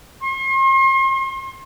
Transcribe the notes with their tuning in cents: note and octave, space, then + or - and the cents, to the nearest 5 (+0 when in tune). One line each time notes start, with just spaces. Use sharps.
C6 +40